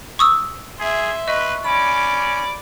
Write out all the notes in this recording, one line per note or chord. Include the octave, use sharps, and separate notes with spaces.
C#6 D#6 E6
G#4 E5 C6
B4 D#5 C#6
C#4 D5 B5 D6